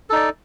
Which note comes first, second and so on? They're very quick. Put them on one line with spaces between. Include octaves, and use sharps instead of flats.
A4 D#4 D5